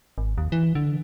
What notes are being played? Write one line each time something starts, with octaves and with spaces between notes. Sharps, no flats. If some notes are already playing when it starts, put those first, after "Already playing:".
G#1
D#2
E3
D3